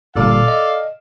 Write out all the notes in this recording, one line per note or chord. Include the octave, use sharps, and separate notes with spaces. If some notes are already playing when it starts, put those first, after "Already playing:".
G1 A#2 G3 A4 D5 F5
D#5